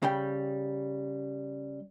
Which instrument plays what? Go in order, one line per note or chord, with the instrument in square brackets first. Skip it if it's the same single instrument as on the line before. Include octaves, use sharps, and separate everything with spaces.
[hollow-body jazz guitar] C#3 G3 G5